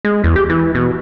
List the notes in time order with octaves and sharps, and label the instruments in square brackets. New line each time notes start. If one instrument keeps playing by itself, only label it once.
[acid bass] G#3
E2
G4
E3
B2